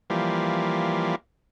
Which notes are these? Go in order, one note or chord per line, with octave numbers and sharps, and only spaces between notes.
E3 F3 G3 A#3